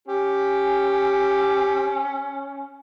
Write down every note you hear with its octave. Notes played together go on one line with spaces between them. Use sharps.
C#4 G4